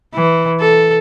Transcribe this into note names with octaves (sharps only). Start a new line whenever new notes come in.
E3
A4